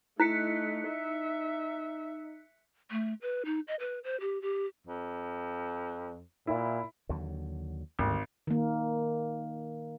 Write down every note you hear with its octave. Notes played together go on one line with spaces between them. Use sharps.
A3 D#4 E4 F#6 B6 C#7
E5
A3
B4
D#4
D#5
B4
C5
G4
G4
F2
A#2 E4
D#2 D3 F#3
G#1 D2 D3 G3
D#3 A#3